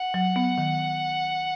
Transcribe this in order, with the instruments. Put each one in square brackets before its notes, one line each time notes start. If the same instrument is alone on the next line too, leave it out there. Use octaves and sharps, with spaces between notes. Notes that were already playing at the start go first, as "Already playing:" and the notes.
Already playing: [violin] F#5
[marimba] F#3
B3
D#3